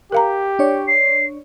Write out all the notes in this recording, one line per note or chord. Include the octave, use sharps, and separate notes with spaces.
G4 A#4 F5 A#5
D4 C#5 D5
C7